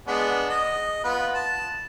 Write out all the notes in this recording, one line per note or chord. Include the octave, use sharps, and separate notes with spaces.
G#3 B3 D4
D#5
B3 F4 B4
A5